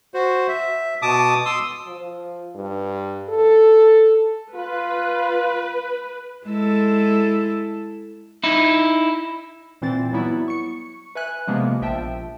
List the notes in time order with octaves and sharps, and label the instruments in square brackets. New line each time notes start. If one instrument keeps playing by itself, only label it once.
[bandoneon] F#4 C5
E5
B2 A5 D6 D#6
C6 D#6 E6
[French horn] F3
G2
A4
[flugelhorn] F4 [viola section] B4
[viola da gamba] G#3 E4 A4
[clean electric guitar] D#4 E4
[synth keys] A#2 E3 C4 A6
F#3 G3 B3 E4
C#6 C#7
B4 E5 G#5 F#6
C3 F3 G#3 A#3 B3
A#1 F3 E5 G5 A5